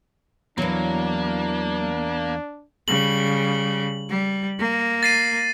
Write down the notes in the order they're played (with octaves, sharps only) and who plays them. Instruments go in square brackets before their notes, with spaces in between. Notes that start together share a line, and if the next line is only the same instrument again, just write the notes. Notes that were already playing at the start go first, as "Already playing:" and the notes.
[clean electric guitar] E2 [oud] E3 F#3 [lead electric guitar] A#3 [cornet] D4
[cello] C#3 G3 [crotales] F#7
[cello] G3
A#3
[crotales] A6 C7 D#7